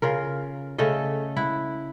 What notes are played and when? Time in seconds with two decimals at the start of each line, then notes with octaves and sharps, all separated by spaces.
0.02 C#3 F4 A#4
0.78 C#3 A3 A4 D#5
1.36 E4 F#5